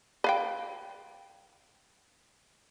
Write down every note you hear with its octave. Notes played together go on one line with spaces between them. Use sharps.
B4 F5 G5